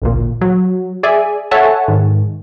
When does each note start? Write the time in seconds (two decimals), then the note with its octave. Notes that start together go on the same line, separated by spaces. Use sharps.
0.02 A1 D2 A#2
0.41 F#3
1.03 G#4 D5 E5 G#5
1.51 A4 C#5 E5 F#5 G#5 A5
1.88 G#2 D#3